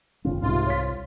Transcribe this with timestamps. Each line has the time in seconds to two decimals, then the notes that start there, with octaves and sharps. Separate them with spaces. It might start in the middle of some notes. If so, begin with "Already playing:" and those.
0.25 F1 C#3 C4 F4
0.42 C2 G#2 C3 F4
0.67 C#5 B6